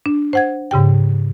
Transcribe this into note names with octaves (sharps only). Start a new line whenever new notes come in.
D4
C5 F#5 G#6
G#2 C#3 G4 G5